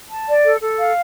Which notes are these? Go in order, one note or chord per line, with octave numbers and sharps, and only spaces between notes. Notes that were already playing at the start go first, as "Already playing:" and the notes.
A5
D5
A4
A4
F5